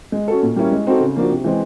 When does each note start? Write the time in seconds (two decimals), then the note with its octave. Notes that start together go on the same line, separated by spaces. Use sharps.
0.12 G#3
0.28 C#4 F#4 A4
0.43 A#2
0.56 G3 A#3 C#4 E4
0.72 G#3
0.87 C4 D#4 F#4 A4
1.00 C#3
1.16 F3 A#3 D4 F#4
1.31 C3
1.44 E3 G#3 C4